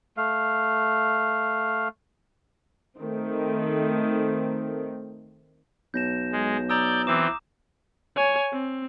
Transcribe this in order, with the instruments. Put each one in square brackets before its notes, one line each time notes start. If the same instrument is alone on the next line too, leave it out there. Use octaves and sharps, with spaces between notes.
[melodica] A3 F5
[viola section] D#3 A3 C4
[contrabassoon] B1 [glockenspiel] G6 A#6 E7
[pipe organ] G#3
[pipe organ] D5 G6 [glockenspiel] A#5 D#6 E6
[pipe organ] E3 C4 [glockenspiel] D6 E7
[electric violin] C#5 G#5
C4